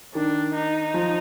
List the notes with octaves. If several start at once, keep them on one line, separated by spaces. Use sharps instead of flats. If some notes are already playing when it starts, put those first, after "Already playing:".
D#3 D4
D#4
F3